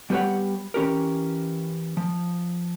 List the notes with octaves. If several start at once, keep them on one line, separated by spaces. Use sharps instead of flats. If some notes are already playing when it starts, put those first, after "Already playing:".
G3 B3 G4 B4 C#5 F#5
E3 C#4 G4 A#4
F3